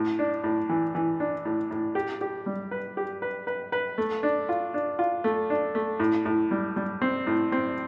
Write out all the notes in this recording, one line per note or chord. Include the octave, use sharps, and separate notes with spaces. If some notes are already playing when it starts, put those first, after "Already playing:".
Already playing: A2
D4
A2
E3
E3
D4
A2
A2
G4
G4
G3
B4
G4
B4
B4
B4
A3
D4
F4
D4
F4
A3
D4
A3
A2
A2
G3
G3
C4
A2
C4